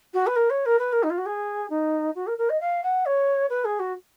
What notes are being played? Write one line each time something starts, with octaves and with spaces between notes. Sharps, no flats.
F#4
B4
A#4
C#5
A#4
B4
A#4
D#4
F4
F#4
G#4
D#4
F#4
A#4
A#4
D#5
F5
F#5
C#5
B4
G#4
F#4